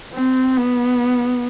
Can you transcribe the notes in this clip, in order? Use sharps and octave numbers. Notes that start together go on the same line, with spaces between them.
C4
B3